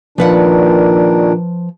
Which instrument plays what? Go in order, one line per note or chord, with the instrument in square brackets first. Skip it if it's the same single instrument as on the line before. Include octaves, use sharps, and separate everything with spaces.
[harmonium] A#2 D#3 D4 [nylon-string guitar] F3 B4 F#5